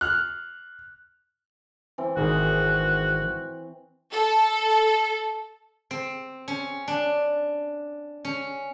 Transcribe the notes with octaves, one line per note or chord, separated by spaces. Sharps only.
F6 F#6
E3 C4
G#1 D#3 F#4 G#4
A4
C4
C#4
D4
C#4